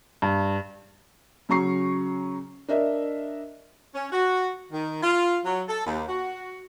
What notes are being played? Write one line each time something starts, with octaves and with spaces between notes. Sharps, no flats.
G2
C#3 F#3 C#4 A#5 C#6 C7
D4 A#4 D#5 E5
C#4
F#4
D#3
F4
F#3
A4
D#2
F#4